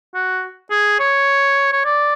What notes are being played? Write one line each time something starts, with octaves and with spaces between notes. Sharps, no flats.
F#4
G#4
C#5
C#5
D5